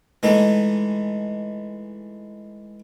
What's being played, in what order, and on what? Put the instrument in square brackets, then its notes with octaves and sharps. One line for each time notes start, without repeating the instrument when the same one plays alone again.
[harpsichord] E3 G#3 A3 D#4